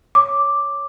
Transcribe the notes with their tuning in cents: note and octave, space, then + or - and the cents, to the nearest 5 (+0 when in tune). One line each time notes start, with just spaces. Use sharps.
C#5 +0 D6 +0